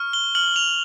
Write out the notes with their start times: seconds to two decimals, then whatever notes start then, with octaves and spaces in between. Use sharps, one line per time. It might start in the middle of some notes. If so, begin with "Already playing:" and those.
Already playing: C#6 F6
0.13 G7
0.35 F6 F#7
0.56 F7